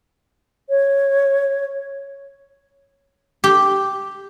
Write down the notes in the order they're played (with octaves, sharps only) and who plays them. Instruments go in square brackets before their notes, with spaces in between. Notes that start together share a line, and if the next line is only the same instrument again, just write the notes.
[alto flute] C#5
[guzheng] G4